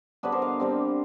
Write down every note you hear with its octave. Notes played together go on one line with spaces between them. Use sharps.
D3 G3 B3 D4 B4 C#5
A#4 C5
D#5 F5
D3 G3 C4